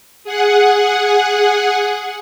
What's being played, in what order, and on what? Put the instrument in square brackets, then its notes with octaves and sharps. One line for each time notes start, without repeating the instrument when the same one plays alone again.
[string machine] G#4 F#5